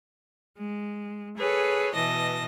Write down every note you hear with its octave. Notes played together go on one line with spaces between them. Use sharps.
G#3
G#4 A4 B4 C#5
B2 E3 D#5 A5 A#6